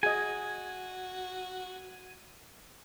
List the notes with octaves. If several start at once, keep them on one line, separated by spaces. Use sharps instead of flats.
F#4 G#4 D#5 G#5